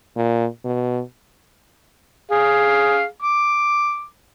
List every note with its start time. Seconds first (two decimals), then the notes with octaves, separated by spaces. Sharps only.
0.16 A#2
0.64 B2
2.31 G#4 F5
3.22 D6